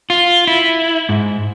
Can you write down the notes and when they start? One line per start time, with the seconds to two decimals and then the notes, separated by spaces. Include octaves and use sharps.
0.10 F4
0.47 E4
1.09 G#2